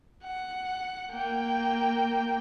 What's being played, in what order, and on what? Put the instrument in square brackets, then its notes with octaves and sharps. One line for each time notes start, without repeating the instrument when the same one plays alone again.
[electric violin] F#5
A#3 G5